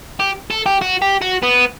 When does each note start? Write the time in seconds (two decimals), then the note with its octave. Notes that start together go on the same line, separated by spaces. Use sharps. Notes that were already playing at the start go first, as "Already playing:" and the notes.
0.20 G4
0.51 A4
0.66 G4
0.81 F#4
1.02 G4
1.22 F#4
1.43 B3